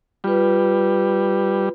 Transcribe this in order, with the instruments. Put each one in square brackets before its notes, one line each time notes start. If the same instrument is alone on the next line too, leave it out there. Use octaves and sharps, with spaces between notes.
[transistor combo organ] G3 [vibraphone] F4 B4